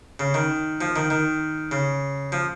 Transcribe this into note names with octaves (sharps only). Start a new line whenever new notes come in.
C#3
D#3
F3
D#3
D#3
C#3
F3